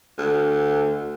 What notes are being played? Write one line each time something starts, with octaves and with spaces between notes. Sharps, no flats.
D2